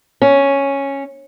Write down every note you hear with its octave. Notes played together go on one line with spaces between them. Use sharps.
C#4